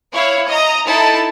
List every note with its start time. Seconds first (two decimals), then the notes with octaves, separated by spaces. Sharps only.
0.12 E4 C#5 F5
0.47 D#5 A#5
0.86 D#4 E4 A4 A5